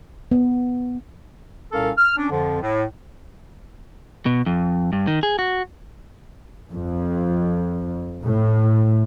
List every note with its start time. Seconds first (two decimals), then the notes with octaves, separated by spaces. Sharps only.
0.31 B3
1.72 C2 A#2 C#4 A4 A#4 F5
1.98 F6
2.17 C#4 D4
2.30 F2 D3 F3
2.61 A2
4.26 B2
4.46 F2
4.93 G2
5.07 D#3
5.23 G#4
5.39 F#4
6.71 F2
8.24 A2